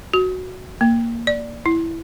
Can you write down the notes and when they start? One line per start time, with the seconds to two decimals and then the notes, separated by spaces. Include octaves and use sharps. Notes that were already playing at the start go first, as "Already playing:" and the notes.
0.14 F#4
0.81 A#3
1.27 D5
1.66 E4